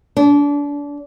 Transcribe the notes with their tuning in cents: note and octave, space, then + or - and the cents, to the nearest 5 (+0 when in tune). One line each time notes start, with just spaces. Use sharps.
D4 -30